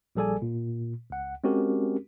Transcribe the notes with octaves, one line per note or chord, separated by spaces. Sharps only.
A#1 G3 G#4 A4 D5 G#5
A#2
C#2 F#5
G#3 C4 C#4 F#4 G4 A#4